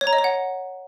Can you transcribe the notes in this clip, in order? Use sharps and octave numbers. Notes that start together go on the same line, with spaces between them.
C#5
A#5
D#5
C#5
F#5